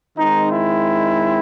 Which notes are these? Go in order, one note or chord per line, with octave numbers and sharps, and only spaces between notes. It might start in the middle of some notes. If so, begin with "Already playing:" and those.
D#3 G#3 C4 D#4
E4